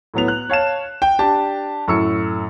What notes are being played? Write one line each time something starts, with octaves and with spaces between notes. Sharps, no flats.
A2 F#3 B3 F7
F#6
C#5 F5 A5 E7
G5
D4 G4 A5
F#2 A2 C#6 E6 C#7